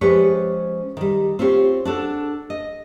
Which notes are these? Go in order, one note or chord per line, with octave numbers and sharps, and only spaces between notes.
F3 G#3 C#4 G4 B4 C#5
D#3 G3
C4 F4 G4 C#5
D4 F#4 A4
D#5